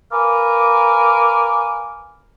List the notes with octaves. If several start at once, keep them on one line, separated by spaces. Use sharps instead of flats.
A#4 B4 F5 G#5 D6